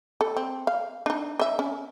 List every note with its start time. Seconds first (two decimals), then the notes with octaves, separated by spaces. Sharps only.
0.21 A4
0.37 C4
0.67 F5
1.06 D4 D#4
1.39 D#5 E5
1.59 C#4